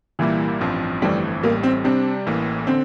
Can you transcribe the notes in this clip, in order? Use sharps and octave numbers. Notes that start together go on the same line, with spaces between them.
C2 A#2 E3 G3 A#3 E4
A1 G2 F3 C4
G1 F2 E3 G3 A3 C4
A1 A2 G3 A#3
C4
C3 G3 C4 D4 G4
A1 A2 E3 A#3
D3 C4